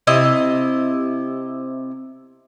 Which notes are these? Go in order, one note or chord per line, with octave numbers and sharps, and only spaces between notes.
C3 E4 D#5